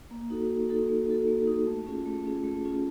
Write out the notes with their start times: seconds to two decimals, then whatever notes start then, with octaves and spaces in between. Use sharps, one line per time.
0.11 A#3
0.30 D#4 F#4 A4
0.50 A#3
0.69 D#4 F#4 A4
0.88 A#3
1.08 D#4 F#4 A4
1.28 A#3
1.47 D#4 F#4 A4
1.67 A3
1.86 C#4 F4 G#4
2.05 A3
2.26 C#4 F4 G#4
2.44 A3
2.65 C#4 F4 G#4